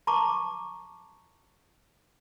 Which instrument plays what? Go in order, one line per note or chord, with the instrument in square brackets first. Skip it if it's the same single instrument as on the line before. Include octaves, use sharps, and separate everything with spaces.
[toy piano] A5 A#5 C#6 D6